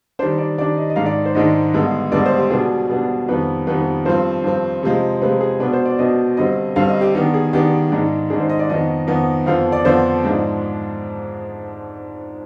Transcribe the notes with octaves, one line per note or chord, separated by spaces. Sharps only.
D#3 G3 D4 C5
D5
D#3 G3 D4 D5
D#5
D#5
G#2 D#3 G#3 D4 F5
D5
C5
G#2 D#3 G#3 D4 D#5
G2 D3 G#3 B3
G2 D3 G#3 B3 D5
C5
G4
B2 G3 B3 D4 G#4
B2 G3 B3 D4
F2 D#3 G3 B3 B4
F2 D#3 G3 B3 B4
G2 F3 C4 C5
G2 F3 C4
C3 F3 G#3
C3 F3 G#3 B4
G#4
B2 B3 D4 B4
C5
D5
B2 B3 D4 D#5
G2 D3 G3 C4 D#5
G2 D3 G3 C4 F5
D#5
G4
D#3 B3 D4 G4
G#4
D#3 B3 D4 G4
G#2 D#3 G#3 D4
G#2 D#3 G#3 D4 G#4
C5
D#5
D5
F2 D#3 B3 D#5
F2 D#3 B3
F2 D3 F3 B3 F5
D5
F2 D3 F3 B3 C5
G#2 F3 G#3 D4